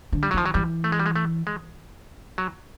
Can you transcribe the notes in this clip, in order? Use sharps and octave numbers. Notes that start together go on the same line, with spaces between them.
D3
G3
F#3
D#3 F3
F#3
E3 G3
A3
G#3
G3
G#3
A3
G#3
F#3